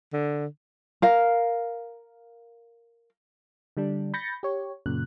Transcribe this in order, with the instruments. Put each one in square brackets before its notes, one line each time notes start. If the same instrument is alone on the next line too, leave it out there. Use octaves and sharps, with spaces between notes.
[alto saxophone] D3
[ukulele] A#4 F5
[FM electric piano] D3 G3 D4
B5 G6 A6 A#6 C#7
G4 C#5
F#2 A#2 C#3 F#6